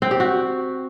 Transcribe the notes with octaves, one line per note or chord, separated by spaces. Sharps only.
C4
G4
F#4